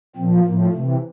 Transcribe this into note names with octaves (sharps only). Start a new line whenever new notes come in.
A#2 F3 C4
A2 F3 A#3
C3 A3
E3